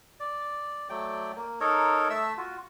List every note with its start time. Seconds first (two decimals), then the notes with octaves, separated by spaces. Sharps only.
0.20 D5
0.89 F#3 A3 D5 G5
1.36 A#3
1.60 D#4 A4 A#4 C#5
2.10 A3 E5 A5 E6
2.37 F4 F#4